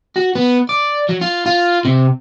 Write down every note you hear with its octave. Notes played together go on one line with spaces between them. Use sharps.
F#4
B3
D5
F#3
F4
F4
C3